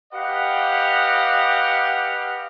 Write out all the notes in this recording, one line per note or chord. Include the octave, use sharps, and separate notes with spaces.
G4 B4 D#5 F5 F#5